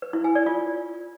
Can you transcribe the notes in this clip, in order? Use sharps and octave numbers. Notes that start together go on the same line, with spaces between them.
B4
E4
G#5
D5
F4